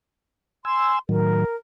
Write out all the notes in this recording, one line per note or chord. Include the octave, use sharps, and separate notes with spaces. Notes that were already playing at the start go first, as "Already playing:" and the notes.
G#5 C6 E6
A2 D#3 F#3 A#4